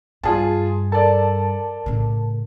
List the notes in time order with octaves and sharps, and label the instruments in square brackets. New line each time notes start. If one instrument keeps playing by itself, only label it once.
[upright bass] G2 [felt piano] F4 G#4 A5
[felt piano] A4 D5 [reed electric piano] A#4 A5
[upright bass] A2 C#3